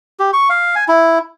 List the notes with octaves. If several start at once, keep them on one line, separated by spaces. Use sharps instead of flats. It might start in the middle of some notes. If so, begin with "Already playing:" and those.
G4
C#6
F5
G#5
E4